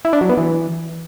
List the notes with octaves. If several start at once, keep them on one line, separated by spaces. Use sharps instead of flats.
E4
D4
F#3
B3
E3